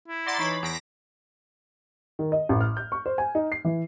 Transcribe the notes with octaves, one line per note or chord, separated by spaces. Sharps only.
E4
D5 F#5 A#5 C6 D6 A6
E3 D#4 C#5 A#5 B5 C7
E2 A#6 B6 D7
D#3
D#5
A1
F6
G6
C#6
C5
G#5
D#4
C7
E3